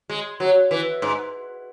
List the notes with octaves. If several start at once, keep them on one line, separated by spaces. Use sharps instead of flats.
G#3
F#3
E3
G#2